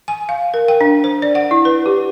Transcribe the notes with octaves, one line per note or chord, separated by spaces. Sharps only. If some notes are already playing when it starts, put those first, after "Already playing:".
G#5
F5
A#4
G5
D4
C5
D5
F#5
E4
B4
G4